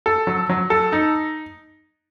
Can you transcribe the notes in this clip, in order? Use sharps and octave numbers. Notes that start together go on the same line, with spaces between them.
A4
F#3
F#3
A4
D#4